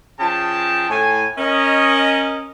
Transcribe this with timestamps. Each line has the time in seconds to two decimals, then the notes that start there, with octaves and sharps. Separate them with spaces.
0.19 F3 C#4 G#4 G5 A5
0.89 A2 G#5
1.38 C#4 A#4 D#5